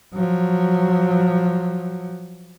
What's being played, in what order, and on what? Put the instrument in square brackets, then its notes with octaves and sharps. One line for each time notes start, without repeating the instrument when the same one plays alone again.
[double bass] F3 F#3